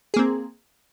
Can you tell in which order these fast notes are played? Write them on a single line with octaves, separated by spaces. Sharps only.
G#4 A#3 C4